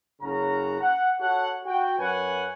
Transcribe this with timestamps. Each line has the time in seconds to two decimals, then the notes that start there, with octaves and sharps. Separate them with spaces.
0.21 F#1 C#3 C#4 F#4 A#5
0.80 F#5
1.20 F#4 A4 C#5 F#5
1.65 F#4 G5
1.98 F#2 B4 C#5 F#5 G#5